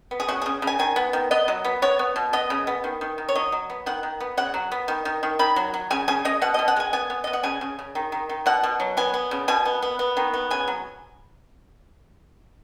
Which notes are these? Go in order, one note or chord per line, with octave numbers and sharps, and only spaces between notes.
B3
G#4
C#3 F#4
G#4
C#3
C#3
G#5
D#3 G#5
B3
D#3
B3 D#5
F#3
B3
B3 C#5
B3
B2
B3 D#5
C#3
B3
D#3
D#3
D#3
C#5
F#3 D#5
F#3
B3
D#3 F#5
D#3
B3
C#3 F#5
F#3
B3
D#3
D#3
D#3
D#3 B5
F#3
F#3
C#3 G#5
C#3 G#5
C#3 D#5
B2 F#5
D#5
B2
F#5
G#3 G#5
B3 G#5
B3
B3 D#5
F#5
C#3 G#5
C#3
C#3
D#3
D#3
D#3
B2 F#5
B2
F#3
B3 G#5
B3
C#3
B2 G#5
B3
B3
B3
D#3
B3
C#3 G#5
F#3